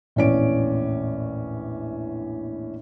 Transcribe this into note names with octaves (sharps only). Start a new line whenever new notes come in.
A#1 E2 A2 C#4 D5 D7